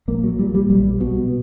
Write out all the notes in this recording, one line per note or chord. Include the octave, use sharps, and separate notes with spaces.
A#1 A#3
F#3
A#2 G3
G3
B1 G3
B2